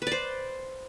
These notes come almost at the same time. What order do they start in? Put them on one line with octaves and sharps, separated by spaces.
B4 D5 C5